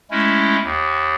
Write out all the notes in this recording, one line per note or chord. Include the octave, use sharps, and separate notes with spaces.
G#3 A3 C#4 E4
D#2